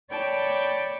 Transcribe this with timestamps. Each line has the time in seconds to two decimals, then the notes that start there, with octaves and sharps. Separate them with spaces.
0.11 C#5 D5 G5 A5 B5 C#6